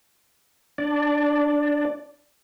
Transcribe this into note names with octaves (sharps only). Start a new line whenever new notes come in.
D4 D5